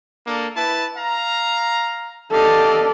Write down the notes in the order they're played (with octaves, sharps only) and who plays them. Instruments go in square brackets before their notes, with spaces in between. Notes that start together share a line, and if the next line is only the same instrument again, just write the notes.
[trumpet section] A#3 D4 A4
E4 B4 A5
F5 A#5
[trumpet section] G4 D#5 F5 [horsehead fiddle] A4 D5